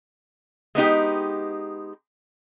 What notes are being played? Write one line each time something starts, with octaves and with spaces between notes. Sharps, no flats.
G#3 B3 D#4 G4